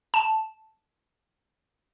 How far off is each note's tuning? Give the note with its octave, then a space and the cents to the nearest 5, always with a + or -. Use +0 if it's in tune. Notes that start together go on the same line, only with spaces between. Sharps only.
A5 -5